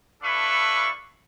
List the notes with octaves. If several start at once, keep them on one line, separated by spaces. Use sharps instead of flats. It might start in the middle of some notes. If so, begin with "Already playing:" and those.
D4 E4 A4 B4 F5 C#6